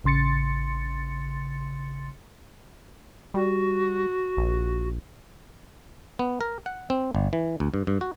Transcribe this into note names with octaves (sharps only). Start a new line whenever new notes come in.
A1 C#3 C6 A6 C#7
G3 F#4
A#1
B3
A#4
F#5
C4
G1
E3
D2
G2
G2
F#4